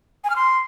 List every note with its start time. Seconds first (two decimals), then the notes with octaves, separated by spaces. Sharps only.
0.24 G#5
0.30 F6
0.36 C6